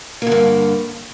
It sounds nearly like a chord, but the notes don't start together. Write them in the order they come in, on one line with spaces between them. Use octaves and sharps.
A#3 D3 G2